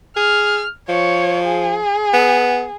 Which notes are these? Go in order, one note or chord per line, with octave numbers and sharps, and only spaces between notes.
G#4 F6
F3 C#5
G#4
B3